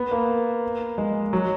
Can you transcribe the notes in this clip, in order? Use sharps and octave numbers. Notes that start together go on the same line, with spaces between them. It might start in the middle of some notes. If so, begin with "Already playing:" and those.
Already playing: B3
A#3
G#3
F#3